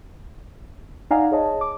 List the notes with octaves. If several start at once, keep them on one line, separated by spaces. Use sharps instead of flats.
D#4 D5 F5 F#5 G#5 A#5
G#4 C#5 D#5 A5
D6